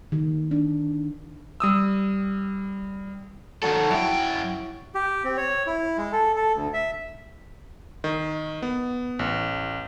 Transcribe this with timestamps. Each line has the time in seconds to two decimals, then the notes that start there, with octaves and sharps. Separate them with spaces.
0.12 D#3
0.51 D4
1.60 G3 D#6 E6
3.63 D#3 F#3 F#4 A4
3.90 F#2 E4 G5
4.95 G4
5.24 C4
5.37 C#5
5.67 E4
5.98 G#3
6.13 A4
6.36 A4
6.55 D2
6.73 E5
8.04 D#3
8.62 B3
9.19 A1